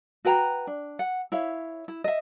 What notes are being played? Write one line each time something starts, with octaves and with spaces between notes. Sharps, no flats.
F#4 B4 G5 A#5
D4
F#5
E4 C#5 E5 F5
E4
D#5 E5